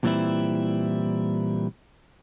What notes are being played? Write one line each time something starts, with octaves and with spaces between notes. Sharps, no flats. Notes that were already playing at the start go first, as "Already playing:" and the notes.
A#2 E3 G3 C4 E4